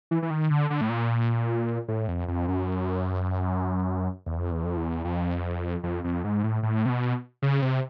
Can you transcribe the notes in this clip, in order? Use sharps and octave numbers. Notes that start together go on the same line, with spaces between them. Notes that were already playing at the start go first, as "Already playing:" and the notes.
E3
E3
D#3
D3
D3
A2
A#2
A2
F2
F2
F#2
E2
F2
E2
F2
E2
F2
F2
F2
G#2
A2
A2
C3
B2
C#3
C3